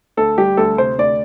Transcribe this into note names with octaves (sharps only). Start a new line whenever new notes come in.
D2 A4
G3 G4
D2 A4
C3 C5
D2 D5